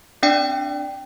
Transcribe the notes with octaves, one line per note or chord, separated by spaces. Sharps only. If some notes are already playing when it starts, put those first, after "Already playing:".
C4 D4 D5 G5